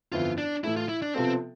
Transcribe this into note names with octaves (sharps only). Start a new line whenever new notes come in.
G1 F2 E3 B3 E4 F4
D4
A2 E3 A3 E4
F4
E4
D4
C3 F3 B3 C4 F4 A4